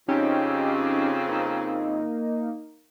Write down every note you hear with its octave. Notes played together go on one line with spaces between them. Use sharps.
F2 C#3 C4 C#4 D#4 G4
A#3 D#4